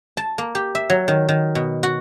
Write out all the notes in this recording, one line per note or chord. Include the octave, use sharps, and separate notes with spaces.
A5
A#3
G4
E5
F#3
D#3
D#3
B2
F#4